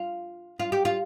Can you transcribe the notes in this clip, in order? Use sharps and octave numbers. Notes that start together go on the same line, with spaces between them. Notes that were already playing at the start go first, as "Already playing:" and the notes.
Already playing: F4
F4
G4
F4